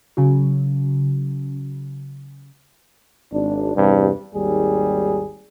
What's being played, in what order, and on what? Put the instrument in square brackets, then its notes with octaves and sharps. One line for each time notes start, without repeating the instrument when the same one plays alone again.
[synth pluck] C#3 F#3
[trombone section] G#1 D4
E2 G2 C3
G#1 D#2 G3 G#4